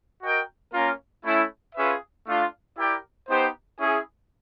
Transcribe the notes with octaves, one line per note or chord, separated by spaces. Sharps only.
F#4 A#4 D#5 G5
A#3 C#4 F4 A#4
A3 C#4 E4
C#4 F4 G#4 B4 E5
A3 D4 F4
E4 G4 A#4 D5 G5
B3 D#4 G4 C5
C#4 E4 G#4